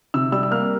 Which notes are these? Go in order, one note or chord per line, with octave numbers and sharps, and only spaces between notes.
C3 E6
G3 E6
E6
A#3 F6